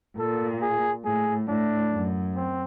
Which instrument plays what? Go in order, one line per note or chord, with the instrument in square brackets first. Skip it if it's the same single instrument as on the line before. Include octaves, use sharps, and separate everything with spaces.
[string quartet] A#2 [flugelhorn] A4
[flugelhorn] G#4
[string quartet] A2 [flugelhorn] G#4
[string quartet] A2 [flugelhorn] D4
[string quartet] F#2
[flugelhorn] C4